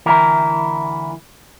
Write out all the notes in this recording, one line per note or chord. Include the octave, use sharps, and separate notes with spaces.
D2 E3 E4 A#4